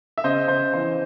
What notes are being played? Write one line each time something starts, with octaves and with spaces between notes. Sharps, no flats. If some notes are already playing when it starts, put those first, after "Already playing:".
E5
C#3 C5 D#5
C#3 C5
E3 C5